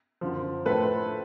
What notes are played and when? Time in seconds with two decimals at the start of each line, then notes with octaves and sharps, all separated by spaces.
0.21 F#2 D3 F3
0.66 A2 F3 A4 B4